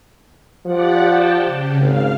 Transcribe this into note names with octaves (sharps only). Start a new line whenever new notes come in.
F3 G4 D5 F#5
G5 A5
C#3
G#1 F5